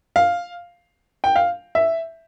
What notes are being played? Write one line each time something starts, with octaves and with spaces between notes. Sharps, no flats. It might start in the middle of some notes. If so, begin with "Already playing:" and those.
F5
G5
F5
E5